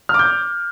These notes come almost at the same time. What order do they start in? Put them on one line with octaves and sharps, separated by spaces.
F6 D6 G6